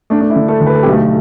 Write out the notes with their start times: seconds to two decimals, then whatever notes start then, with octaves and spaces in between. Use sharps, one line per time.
0.10 A3 D4
0.21 D4
0.30 E4
0.36 D3
0.48 A3 A4
0.61 D2
0.66 B4
0.75 A4
0.83 B1 G4
0.91 A3 A4